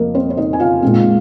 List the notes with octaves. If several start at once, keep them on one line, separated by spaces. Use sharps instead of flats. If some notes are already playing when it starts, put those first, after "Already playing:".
Already playing: F2 A#3 A#4 D#5
C4 C5
C5
D#4 D#5
G#5
F4 F5
A#2 G#3 C4